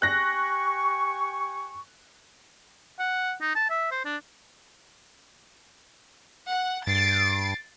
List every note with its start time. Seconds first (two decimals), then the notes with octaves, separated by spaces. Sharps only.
0.02 G4 G#5 C#6 F#6 A#6
2.99 F#5
3.41 D#4
3.55 A5
3.70 E5
3.91 C5
4.05 D4
6.51 F#5
6.87 G2 A6 C7 D7